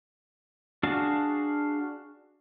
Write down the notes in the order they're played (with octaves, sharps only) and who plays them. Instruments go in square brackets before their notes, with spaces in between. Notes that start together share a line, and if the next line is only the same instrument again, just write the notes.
[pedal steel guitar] D4 F#4 G#4 F5 A5